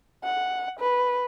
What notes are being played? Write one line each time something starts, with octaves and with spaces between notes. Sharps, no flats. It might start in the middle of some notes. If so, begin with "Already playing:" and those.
F#5
B4